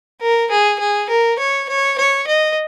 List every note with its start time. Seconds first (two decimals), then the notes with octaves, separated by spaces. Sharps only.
0.21 A#4
0.51 G#4
0.80 G#4
1.10 A#4
1.39 C#5
1.69 C#5
1.98 C#5
2.28 D#5